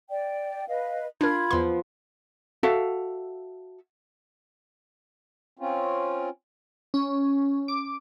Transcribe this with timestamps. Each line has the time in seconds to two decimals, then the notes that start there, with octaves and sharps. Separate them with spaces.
0.09 D5 G5
0.68 B4 D#5 F5
1.21 D4 F4 A#4 B5 G#6
1.51 E2 F3 B3 C6
2.63 F#4 A4 E5 F5
5.59 C4 C#4 F4
6.94 C#4
7.68 D6